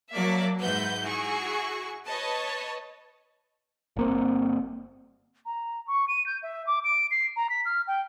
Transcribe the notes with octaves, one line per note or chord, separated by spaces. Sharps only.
F#3 A#3 D5 E5 A5 D6
G#2 B4 E5 F#5 G6
E4 F#4 G#4 C#6
B4 C#5 D#5 A5
G1 A#3 C4
A#5
C#6
D#7
G6
E5
D6
D7
C7
A#5
B6
F6
G5